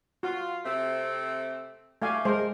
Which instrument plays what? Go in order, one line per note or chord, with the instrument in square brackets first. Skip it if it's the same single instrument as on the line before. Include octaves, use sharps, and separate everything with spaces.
[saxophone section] F4 [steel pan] F#4
[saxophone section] C3 A3 C4
[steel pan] A3 F5 G#5 [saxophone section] F#4 G4 D5
[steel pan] G#3 C5 [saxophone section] A#4